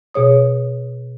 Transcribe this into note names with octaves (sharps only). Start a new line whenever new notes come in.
B2 G#4 C#5 D#6